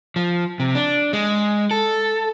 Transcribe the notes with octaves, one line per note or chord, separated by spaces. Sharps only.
F3
C3
D4
G#3
A4